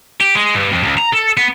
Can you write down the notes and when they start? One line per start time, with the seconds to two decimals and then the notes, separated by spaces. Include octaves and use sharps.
0.21 G4
0.36 G#3
0.56 G2
0.73 F2
0.85 C#2
0.99 A#5
1.14 A4
1.37 B3